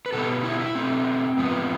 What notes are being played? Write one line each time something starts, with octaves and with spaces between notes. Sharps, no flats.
B4
B2 G3 B3 A4
E4
E4
B2 A3 C4
G2 F3 B3